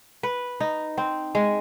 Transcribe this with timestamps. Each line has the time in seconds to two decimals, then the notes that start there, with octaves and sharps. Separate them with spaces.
0.23 B4
0.60 D#4
0.98 C4
1.35 G#3